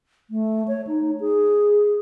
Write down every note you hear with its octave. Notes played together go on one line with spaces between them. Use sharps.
A3
C#5
D#4
G#4